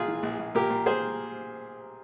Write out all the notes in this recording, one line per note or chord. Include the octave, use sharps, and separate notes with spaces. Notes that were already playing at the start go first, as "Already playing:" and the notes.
Already playing: A#1 A#2 F4 G#4
E3
A#1
A#1
A#2 G4 A#4
A#2
G#4 C5